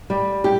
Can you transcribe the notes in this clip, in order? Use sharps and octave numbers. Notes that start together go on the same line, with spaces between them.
G3
G4